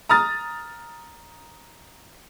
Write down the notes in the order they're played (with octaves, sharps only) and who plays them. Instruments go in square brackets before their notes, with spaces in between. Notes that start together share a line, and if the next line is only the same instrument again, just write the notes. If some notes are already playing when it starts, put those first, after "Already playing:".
[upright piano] A#5 D#6 F6 A6